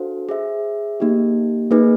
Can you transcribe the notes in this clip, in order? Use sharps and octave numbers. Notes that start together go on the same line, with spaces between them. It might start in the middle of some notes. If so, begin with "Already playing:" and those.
Already playing: D4 F#4 A4 C5 F5
G#4 C5 E5
A#3 D#4 G4
A#3 D#4 G#4 B4